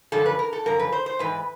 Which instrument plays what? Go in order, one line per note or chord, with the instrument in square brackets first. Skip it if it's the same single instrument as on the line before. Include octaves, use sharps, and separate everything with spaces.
[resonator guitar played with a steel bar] F#2 D3 F3 A4
B4
A#4
A4
F#2 D3 F3 A#4
B4
C5
C5
G#2 E3 B4